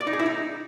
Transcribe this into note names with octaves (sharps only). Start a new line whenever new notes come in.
D5
D#4
G#4
E4
D#4